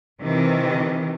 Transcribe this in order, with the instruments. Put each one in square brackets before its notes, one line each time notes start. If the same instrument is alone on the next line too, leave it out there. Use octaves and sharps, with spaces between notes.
[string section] C3 D#3 E3